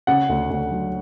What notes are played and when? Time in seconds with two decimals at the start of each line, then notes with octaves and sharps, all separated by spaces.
0.07 C#3 F#5
0.29 D2
0.50 D2
0.71 F#3